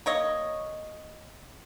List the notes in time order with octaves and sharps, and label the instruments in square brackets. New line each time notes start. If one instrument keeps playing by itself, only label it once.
[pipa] A#3 C#5 D#5